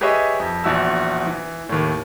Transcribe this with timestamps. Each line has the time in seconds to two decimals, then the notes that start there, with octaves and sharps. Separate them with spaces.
0.01 G4 G#4 B4 C#5 D#5 E5
0.40 F2
0.64 A#1 E2 E4 F#4 E6
1.26 E3
1.69 D#2 A2